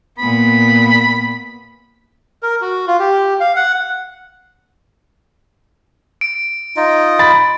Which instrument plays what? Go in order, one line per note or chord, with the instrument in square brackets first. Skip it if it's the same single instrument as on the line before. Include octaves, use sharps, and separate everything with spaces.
[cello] A#2 B3 [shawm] B5
[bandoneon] A#4
F#4
F4
G4
F5
F#5
[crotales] D7
[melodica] D#4 F4 D#5
[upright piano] B5 A6